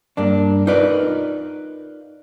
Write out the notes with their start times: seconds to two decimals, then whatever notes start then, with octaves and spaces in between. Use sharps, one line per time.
0.17 G2 A#3 D4
0.67 D#4 F4 A#4 B4 D5